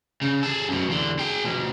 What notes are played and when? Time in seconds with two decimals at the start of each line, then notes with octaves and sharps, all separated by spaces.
0.22 C#3
0.43 G#4 A4
0.68 F#2 B2
0.89 E2 D3
1.19 G#4 G5
1.45 B2 F3